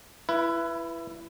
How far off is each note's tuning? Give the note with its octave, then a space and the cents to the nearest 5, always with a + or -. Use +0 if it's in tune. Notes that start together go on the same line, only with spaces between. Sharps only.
E4 +25 B4 -5